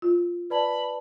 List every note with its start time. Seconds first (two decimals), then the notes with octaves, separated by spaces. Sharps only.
0.02 F4
0.50 B4 D5 A5 B5